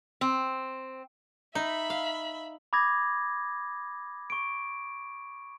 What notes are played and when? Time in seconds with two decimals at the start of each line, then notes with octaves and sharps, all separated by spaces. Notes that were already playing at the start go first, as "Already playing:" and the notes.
0.21 C4
1.55 D#4 E5 B5
1.90 F5
2.73 B5 D6 D#6 G#6 A#6
4.30 C#6 D7